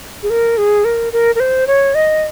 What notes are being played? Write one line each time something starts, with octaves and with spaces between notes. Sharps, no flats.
G#4
A#4
G#4
A#4
A#4
A#4
C5
C#5
D#5